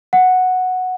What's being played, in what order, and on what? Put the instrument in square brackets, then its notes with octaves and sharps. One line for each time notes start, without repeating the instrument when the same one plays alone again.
[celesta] F#5